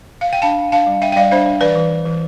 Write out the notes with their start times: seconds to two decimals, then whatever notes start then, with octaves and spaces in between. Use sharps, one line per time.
0.21 F5
0.33 G5
0.42 D4 F5 A5
0.58 D4
0.72 D4 F5 A5
0.87 G3
1.01 D4 E5 G5
1.12 G5
1.16 G3 D5 F5
1.31 D4 C5 E5
1.46 D4
1.61 E3 B4 D5
1.76 E3
1.91 E3
2.06 E3